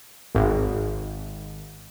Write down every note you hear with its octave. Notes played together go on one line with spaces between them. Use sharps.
G#1